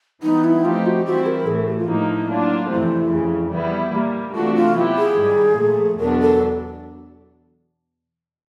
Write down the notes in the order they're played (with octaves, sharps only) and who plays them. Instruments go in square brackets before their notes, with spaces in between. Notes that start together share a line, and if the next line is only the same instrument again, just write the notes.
[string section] E3 G3 B3 [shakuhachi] D#4
[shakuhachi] E4
[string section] F3 A3 C4 D#4 G4 [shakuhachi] F4
[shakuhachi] F#4
[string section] E3 G3 C4 E4 [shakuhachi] F#4
[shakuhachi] A#4
[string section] A2 E3 A3 [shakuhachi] G#4
[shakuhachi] G4
F4
[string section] A2 F3 A#3 D#4 [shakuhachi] E4
[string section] F#3 A#3 D4 F4
[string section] F2 C3 E3 A3 [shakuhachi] E4
[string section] F2 C#3 E3
E3 G3 B3 E4
A#2 G3 A#3
[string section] C3 E3 A3 D4 F#4 [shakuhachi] F4
[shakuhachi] F4
[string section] F#3 B3 E4 G4
[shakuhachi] G#4
[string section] G#2 D#3 G3
A#2 F3 A3
[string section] E2 B2 F#3 B3 D4 [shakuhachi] A#4
[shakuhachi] A4